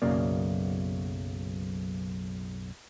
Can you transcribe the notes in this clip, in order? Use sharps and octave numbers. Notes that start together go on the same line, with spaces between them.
B1 F#2 C#3 A#3 D5